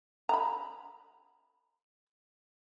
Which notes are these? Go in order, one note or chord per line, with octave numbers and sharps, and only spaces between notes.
A#5 B5